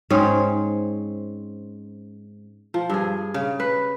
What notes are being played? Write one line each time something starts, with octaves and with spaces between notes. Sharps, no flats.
G#2 C4 C#4 G#4
F3
G2 G#4
C#3
B4